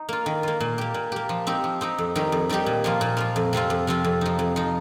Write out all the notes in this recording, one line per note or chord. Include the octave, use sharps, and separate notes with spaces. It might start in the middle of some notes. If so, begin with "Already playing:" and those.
Already playing: D#4
A#3 F4
D#3
A#3 F4
A#2
A#3 G4
A#2
A#3 G4
F3
C4 D#4 G4
F3
C4 D#4 G4
F2
D#3 G3 D#4 G4
F2
D#3 G3 D#4 G4
A#2
F3 A#3 F4
A#2
F3 A#3 F4
F2
C3 F3 C4 F4
F2
C3 F3 C4 F4
F2
F3 D#4
F2
F3 D#4